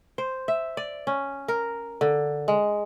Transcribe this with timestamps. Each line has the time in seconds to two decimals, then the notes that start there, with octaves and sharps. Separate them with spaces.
0.18 C5
0.48 E5
0.77 D5
1.07 C#4
1.48 A#4
2.01 D3
2.48 G#3